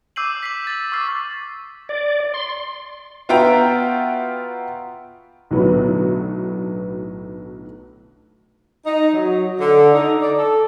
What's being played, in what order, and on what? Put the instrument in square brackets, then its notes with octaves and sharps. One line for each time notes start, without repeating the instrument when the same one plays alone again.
[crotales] D6 E6 G6 C7 D#7 F#7
B6 C7 F#7
A6 F#7
C#6 D6 E6 F6 A6 C7
[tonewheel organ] D5
C6
[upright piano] B3 F4 F#4 E5 G5 A#5
[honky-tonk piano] B1 A2 D3 F#3 B3 B4
[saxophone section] D#4
F#3
D3
D#4
D5
A4